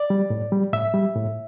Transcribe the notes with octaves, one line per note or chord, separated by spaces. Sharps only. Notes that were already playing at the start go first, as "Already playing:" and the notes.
Already playing: D5
G3
A2
G3
A2 E5
G3
A2